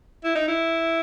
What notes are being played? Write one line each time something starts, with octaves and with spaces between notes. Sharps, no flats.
E4
D#4
E4